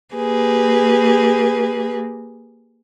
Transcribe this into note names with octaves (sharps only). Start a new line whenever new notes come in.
A#3 G4 G#4 B4